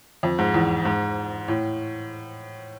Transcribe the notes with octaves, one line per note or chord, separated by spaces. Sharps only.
F2
G#2
E2
G#2
A2